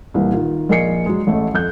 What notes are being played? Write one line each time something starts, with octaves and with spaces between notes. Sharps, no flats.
C2 A#2 E3
D#3 F4
A#1 A#4 D#5 G#5 C7 C#7
F#3 G#3
A1 A3 D#5
F2 F#6 G6